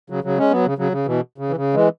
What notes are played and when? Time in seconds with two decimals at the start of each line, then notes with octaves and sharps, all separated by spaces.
0.10 C#3 F#3
0.24 C#3 F#3
0.38 G#3 C#4
0.51 F#3 B3
0.66 C#3
0.78 C#3 F#3
0.92 C#3
1.06 B2 E3
1.38 C#3
1.49 E3
1.56 C#3
1.74 E3 G#3